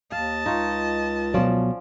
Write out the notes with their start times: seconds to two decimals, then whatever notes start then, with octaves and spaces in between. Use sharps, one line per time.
0.12 D#2 D#5 F5 A5
0.46 C#2 D#4 F4 C#5
1.34 B2 F3 F#3 C#4 D5